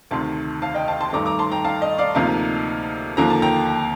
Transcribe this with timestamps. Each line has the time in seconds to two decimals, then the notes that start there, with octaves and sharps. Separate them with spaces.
0.11 D2 C3 D#3 A5 C6
0.62 F5 A5
0.74 D#5 G5
0.88 F5 A5
1.01 A5 C6
1.13 G2 D#3 A3 A#5 D6
1.26 A#5 D6
1.39 A5 C6
1.52 G5 A#5
1.65 F5 A5
1.82 D#5
1.98 D5 F5
2.15 D2 C3 F3 A#3 D#4 F5 A5
3.17 D#2 D3 F3 A#3 A#5
3.30 A5
3.42 G5 A#5